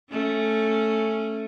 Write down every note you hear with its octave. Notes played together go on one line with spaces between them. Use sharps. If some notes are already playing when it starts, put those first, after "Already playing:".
A3 C#4